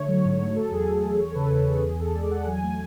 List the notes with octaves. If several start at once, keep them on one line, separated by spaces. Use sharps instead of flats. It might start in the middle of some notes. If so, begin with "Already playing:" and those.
Already playing: D3 A3 C#5
F#3
G#2
A3
F#3 A4
E2 G#4
A3
E2
E2 C#5
A4
C#3 B4
E2 A4
E2 G#4
E2 G#4
E2 A4
G#3 D5
E2 F#5
F#3 G#5
A3 G#5